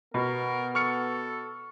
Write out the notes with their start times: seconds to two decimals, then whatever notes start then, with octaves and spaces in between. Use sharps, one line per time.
0.14 B2 B3 A#4
0.75 A4 C#6 F6 C#7